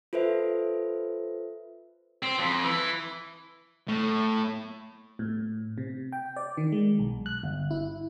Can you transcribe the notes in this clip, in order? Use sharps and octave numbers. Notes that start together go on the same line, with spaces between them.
F4 A4 B4 C5 E5
C4
F2
E3
A2
A2
C3
G5
D5
D#3
G#3
B1
F#6
G1
E4